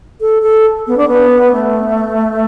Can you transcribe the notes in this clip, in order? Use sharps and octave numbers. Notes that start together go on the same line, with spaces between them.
A4
A4
B3
D4
B3
A3